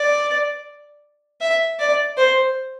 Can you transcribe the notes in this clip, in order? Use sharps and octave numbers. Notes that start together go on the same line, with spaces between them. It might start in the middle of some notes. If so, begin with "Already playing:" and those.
Already playing: D5
E5
D5
C5